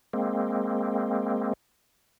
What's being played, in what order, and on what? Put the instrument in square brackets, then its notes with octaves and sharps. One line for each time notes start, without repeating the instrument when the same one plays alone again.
[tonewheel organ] G#3 A#3 C4